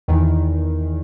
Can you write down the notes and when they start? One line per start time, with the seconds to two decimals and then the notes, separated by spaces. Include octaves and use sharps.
0.08 E2 D#3